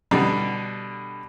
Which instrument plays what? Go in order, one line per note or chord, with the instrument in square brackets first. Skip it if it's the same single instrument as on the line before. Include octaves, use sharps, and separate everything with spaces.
[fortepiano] B2 D3 G3